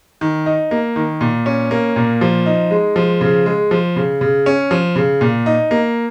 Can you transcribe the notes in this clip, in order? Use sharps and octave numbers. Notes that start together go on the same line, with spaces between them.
D#3
D#4
A#3
D#3
A#2
C#4
A#3
A#2
F3
D#4
G#3
F3
C#3
G#3
F3
C#3
C#3
C#4
F3
C#3
A#2
D#4
A#3